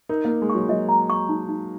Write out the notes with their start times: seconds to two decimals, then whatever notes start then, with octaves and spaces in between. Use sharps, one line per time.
0.09 D#4 A#4
0.25 A#3 A#4
0.42 G#3
0.50 F#3 C#6
0.69 F#3 D#5
0.89 A#5
1.10 C#6
1.29 D#4
1.49 D#4